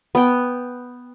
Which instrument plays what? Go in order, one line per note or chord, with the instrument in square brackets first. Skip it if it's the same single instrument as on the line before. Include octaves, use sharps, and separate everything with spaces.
[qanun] B3 G5